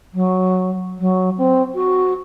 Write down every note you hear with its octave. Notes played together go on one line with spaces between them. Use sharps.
F#3
F#3
C4
F#4